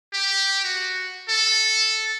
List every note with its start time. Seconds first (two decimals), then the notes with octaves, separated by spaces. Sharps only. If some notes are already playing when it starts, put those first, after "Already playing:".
0.13 G4
0.64 F#4
1.29 A4